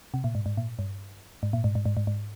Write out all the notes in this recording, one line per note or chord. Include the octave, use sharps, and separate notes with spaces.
C3
A#2
G#2
G#2
A#2
G2
G#2
A#2
G#2
G#2
G#2
G#2
G#2